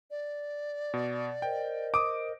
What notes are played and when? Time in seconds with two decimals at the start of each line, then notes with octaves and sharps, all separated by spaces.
0.11 D5
0.94 B2
1.42 A#4 C5 D#5 G5
1.94 D6 D#6 D7